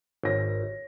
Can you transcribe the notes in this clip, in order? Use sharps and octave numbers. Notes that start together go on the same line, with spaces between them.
G#1 C#5 A#6